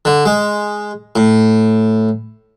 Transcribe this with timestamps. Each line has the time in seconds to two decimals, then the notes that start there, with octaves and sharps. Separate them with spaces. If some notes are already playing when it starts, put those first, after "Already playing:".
0.05 D3
0.26 G#3
1.16 A2